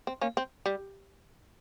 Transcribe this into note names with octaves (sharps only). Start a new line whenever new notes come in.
C4
A#3 C#4
C4
G3